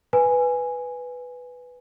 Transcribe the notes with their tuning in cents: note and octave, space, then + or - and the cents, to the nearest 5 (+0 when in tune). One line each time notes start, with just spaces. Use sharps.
B4 +0 G#5 +0